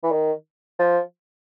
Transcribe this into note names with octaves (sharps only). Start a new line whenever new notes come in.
E3
D#3
F3